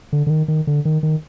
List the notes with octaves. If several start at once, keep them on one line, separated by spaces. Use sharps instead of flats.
D3
D3
D#3
D#3
D3
D#3
D#3